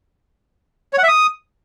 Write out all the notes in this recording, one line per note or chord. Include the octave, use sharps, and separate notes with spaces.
C#5
F#5
E5
D#6